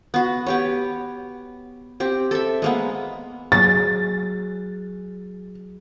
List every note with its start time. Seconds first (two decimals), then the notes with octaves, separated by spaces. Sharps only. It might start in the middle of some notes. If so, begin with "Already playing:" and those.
0.14 B3 F#4
0.47 B3 G4 C#5
2.00 C4 G4
2.31 A4 E5
2.62 G#3 A#3 B3
3.52 F#3 G#4 A6